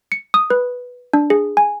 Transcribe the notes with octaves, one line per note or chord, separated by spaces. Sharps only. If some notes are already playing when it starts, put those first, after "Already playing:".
C#7
D#6
B4
D4
G#4
G#5